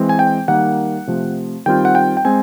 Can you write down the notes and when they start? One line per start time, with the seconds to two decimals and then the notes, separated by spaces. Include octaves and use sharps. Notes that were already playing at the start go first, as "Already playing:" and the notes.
Already playing: E3 G#3 C4
0.09 G#5
0.19 G5
0.48 D#3 G3 A#3 F#5
1.07 C3 F3 A3
1.66 D#3 G3 C4 F4 G5
1.85 F#5
1.95 G5
2.17 G5
2.25 G#3 C4 G#5